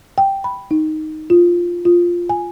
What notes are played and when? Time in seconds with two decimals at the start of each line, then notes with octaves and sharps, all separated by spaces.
0.18 G5
0.44 B5
0.71 D#4
1.30 F4
1.85 F4
2.29 G#5